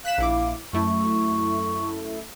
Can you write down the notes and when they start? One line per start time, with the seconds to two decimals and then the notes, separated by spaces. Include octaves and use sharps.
0.05 F5 F#6 B6 E7
0.18 A#1 E4 D6
0.73 F#2 A3 E4 C#6